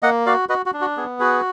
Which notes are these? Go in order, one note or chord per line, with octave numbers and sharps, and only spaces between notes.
A#3 D#5 F#5
F#4 D5 F5
F#4 B4 D#5
F#4
D4
F#4
B3 G#4
F#4 G#4 B4